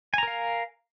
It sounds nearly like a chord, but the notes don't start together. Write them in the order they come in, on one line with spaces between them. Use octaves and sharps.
G#5 A#5 A#4 F5